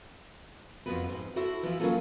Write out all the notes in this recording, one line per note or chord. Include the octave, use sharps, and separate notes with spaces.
F2 F3 G#3 B3 F#4 B4
G#2
E4 F#4 A4 C5
E3 F3 E4
F#3 A#3 C4 C#4 F4 A4